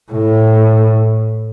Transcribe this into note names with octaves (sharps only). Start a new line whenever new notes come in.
A2